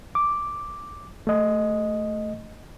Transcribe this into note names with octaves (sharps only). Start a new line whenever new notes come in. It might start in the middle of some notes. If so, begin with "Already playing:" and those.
D6
A3 D#5